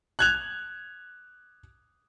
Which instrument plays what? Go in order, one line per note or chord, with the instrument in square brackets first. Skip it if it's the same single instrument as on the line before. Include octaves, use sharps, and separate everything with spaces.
[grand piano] F#6 G#6 F7